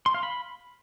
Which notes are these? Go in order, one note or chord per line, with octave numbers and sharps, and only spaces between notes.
C6
F5
B5